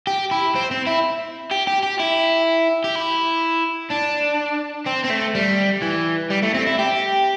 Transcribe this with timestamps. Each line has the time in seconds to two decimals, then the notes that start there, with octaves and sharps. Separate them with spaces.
0.07 G4
0.31 E4
0.55 C4
0.71 C4
0.87 E4
1.51 G4
1.67 G4
1.83 G4
1.99 E4
2.84 G4
2.95 E4
3.91 D4
4.87 C4
5.05 C4
5.10 A3
5.35 G3
5.82 E3
6.31 G3
6.43 A3
6.55 C4
6.67 E4
6.79 G4